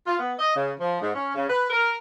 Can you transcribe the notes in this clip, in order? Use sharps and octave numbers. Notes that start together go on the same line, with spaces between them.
F4
B3
D#5
C#3
F3
G#2
C#4
C#3
B4
A#4